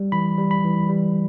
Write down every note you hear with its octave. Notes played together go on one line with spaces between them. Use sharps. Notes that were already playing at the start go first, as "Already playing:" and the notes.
Already playing: G3
E3 B5
G3
B5
E3
G3